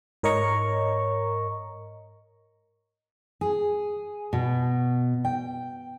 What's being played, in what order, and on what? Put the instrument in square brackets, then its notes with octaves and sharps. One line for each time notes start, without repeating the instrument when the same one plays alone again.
[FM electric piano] G#2 A#4 C#5 D#5 A#5 C#6
[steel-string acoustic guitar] G#4
B2
G5